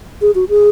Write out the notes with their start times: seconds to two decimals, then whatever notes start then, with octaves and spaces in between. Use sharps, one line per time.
0.21 G#4
0.35 F#4
0.49 G#4